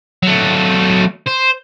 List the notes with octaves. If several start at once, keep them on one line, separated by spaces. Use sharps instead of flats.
F#3 A3
C5